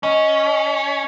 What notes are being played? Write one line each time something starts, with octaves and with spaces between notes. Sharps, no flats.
C#4 D#5